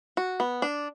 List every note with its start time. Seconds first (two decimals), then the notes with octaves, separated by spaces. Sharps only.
0.17 F#4
0.40 B3
0.62 D4